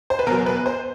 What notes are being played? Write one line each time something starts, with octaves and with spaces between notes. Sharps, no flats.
C5
B4
E2 B2 F#3 A#4
B4
C5